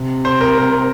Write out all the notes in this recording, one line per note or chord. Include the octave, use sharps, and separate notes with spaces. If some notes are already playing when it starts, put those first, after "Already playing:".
Already playing: C3
C5
A#4
A#4